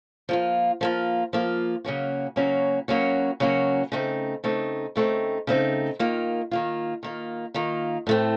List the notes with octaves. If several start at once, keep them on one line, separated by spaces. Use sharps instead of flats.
F3 A#3 F4
F3 A#3 F4
F3 A#3 F4
C#3 F#3 A#3 C#4 F#4
C#3 F#3 A#3 C#4 F#4
C#3 F#3 A#3 C#4 F#4
C#3 F#3 A#3 C#4 F#4
C#3 A3 C4 D#4
C#3 A3 C4 D#4
C#3 A3 C4 D#4
C#3 A3 C4 D#4
D#3 A#3 F4
D#3 A#3 F4
D#3 A#3 F4
D#3 A#3 F4
A2 A3 C4